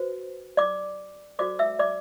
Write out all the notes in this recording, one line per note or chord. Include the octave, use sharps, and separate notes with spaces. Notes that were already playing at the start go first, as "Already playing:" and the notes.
Already playing: F#4 B4 C5
D5 D6
F#4 A4 C5 D5 D6
E5 E6
D5 D6